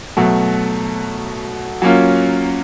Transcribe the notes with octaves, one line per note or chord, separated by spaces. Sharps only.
B2 F#3 A3
F#3 A#3 C#4 F4